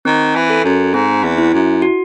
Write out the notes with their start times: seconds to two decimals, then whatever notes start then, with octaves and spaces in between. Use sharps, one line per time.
0.05 D#3 C4
0.35 E3
0.50 A4
0.64 F#2
0.94 G#2 C4
1.24 E2
1.38 E4
1.53 F#2
1.82 F#4